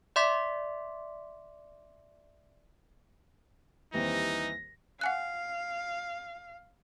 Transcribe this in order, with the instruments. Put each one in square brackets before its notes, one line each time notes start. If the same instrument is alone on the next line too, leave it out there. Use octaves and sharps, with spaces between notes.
[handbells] D5 E5 C6 D6 B6
[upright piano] D#2 G3 C4 [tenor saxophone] E3 [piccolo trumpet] D#4 [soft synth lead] A#6
[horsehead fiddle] F5 [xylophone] F#5 G#5 F#6